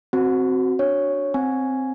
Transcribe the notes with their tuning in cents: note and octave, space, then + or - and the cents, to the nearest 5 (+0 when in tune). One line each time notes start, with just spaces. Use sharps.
C4 +0 F#4 +5
D4 +0 C#5 +0
C4 +0 G#5 +0